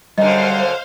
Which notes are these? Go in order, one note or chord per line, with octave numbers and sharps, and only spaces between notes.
F#2 D3 G3 C5 D#5 F5